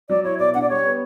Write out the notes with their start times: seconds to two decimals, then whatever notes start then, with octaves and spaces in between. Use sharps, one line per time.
0.09 F#3 D5
0.24 E4 C#5
0.39 B2 D5
0.54 D4 F#5
0.62 D5
0.69 G3 C#5
0.85 B3